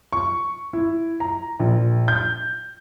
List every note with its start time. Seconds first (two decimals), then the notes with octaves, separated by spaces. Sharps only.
0.13 C#6
0.73 E4
1.20 A#5
1.60 A#1
2.08 G6